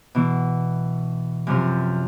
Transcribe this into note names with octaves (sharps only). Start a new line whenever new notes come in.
B2 E3
F#2 C3 F3